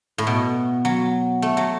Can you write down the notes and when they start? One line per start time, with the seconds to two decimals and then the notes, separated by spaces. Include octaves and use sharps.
0.18 A2
0.27 B2
0.85 F#3
1.42 A3
1.57 F#3